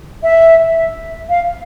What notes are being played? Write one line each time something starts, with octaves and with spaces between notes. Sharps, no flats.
E5
F5